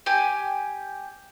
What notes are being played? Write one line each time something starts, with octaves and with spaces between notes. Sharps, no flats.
G4 G#5